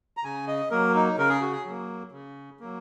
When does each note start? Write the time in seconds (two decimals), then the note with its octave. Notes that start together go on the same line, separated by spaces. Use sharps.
0.17 A#5
0.24 C#3 G#5
0.47 D#5
0.71 F#3 A#3 A#4
0.95 D#4
1.18 C#3 A#4
1.29 G#4
1.41 F#4
1.52 G#4
1.65 F#3 A#3
2.12 C#3
2.60 F#3 A#3